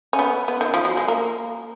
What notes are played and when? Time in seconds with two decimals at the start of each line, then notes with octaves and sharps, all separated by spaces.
0.13 C#4
0.19 B3
0.48 B3
0.61 D#3
0.74 F3
0.85 F#3
0.97 G#3
1.08 A#3